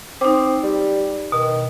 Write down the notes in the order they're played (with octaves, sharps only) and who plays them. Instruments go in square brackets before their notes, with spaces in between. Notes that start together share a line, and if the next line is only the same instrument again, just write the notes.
[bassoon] C4 [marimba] D#4 D6
[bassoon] G3
[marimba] B2 [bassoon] D#3